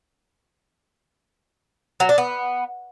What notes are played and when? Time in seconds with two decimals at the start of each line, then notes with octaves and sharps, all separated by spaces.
2.00 F#3
2.09 D4
2.18 B3